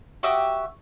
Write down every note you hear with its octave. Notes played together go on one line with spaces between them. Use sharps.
F#4 G4 E5 D#6